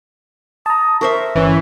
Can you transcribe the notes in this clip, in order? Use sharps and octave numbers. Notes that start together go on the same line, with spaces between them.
A5 A#5 D#6
A#4 C5 E5 C#6
G1 E3 C#4